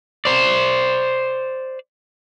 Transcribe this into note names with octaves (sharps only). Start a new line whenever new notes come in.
C5 D5